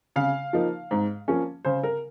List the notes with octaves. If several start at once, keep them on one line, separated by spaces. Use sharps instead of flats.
C#3 F5
F3 A#3 D#4
G#2
F3 A#3 C#4
C#3 C5
A#4